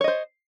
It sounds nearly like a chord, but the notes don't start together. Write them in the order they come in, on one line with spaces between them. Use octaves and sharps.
C#5 D#5 C5